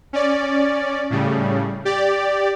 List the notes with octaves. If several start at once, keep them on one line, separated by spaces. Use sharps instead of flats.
C#4 D5
A2 C#3 G3
G4 D5